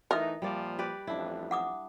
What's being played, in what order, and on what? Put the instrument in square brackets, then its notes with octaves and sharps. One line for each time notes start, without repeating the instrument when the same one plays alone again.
[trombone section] E3 A3 D#4 [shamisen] A#4 [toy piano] D#5 E5 D#6
[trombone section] A#2 F3 [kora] G3 A#3 D5
[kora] G4 B4 D5
[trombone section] A1 F2 [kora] D4 E4
[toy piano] F#5 D6 D#6